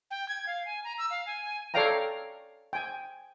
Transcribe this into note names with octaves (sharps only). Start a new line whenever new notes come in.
G5
G#6
F5
G#5
A#5
E6
F5
G#5
G#5
A4 C#5 D5 F5 G5 A#5
G5 G#5